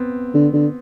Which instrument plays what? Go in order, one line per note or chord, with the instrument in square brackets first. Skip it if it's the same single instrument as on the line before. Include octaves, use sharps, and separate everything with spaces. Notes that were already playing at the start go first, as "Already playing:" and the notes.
Already playing: [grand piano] B3 C4
[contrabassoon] D3
D3